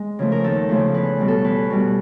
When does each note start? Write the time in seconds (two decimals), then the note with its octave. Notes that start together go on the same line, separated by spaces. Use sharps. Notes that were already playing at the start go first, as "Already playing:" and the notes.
Already playing: G#3
0.19 C#3 F3 A3
0.32 A#4
0.44 D#2 A4
0.69 C#3 F3 A3
0.94 E2 B4
1.20 B2 G3
1.28 A4
1.44 E2 B4
1.70 B2 G3